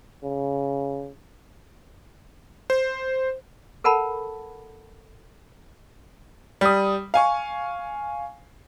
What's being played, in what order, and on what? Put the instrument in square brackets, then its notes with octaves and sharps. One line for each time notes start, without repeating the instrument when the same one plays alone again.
[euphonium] C#3
[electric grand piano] C5
[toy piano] A4 A#4 F#5 A5 B5
[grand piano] G3 D#6
F5 G#5 C#6